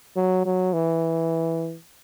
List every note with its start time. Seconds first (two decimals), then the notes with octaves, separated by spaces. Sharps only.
0.16 F#3
0.45 F#3
0.73 E3